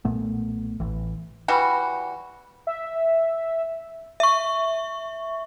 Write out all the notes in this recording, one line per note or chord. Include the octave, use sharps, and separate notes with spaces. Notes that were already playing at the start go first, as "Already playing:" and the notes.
B1 A#2 A3 B3
A1 E3
E3 G3 F#4
E5
E5 C#6